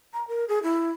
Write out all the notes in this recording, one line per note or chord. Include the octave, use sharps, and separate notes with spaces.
A#5
A#4
G#4
E4